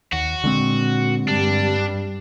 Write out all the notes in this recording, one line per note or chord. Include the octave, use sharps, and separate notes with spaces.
D#2 F#4
A#2 D3 G#3 C4
G2 G3 D4